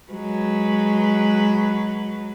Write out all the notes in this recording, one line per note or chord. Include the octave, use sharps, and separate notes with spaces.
F#3 G#3 B4